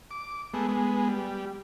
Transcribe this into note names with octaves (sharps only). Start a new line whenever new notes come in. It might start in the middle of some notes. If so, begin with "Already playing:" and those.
D6
G#3 A3 B3
G#3 B3
G3